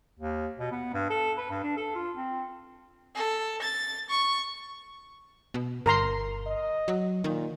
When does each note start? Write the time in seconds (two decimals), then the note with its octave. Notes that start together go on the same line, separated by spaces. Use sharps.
0.19 D#2
0.59 B2
0.72 B3
0.94 G2
1.10 A4
1.37 B4
1.50 G2
1.63 D4
1.77 A4
1.95 F4
2.16 C4
3.15 A4
3.62 A6
4.09 C#6
5.54 B2
5.86 G1 A#4 A#5 C6
6.46 D#5
6.88 F#3
7.24 A#2 D#3